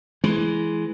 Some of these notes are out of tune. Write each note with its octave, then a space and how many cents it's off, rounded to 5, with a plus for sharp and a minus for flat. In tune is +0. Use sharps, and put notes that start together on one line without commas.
E3 +0 G#3 +15